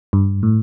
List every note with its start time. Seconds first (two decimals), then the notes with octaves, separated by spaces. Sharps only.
0.13 G2
0.43 A2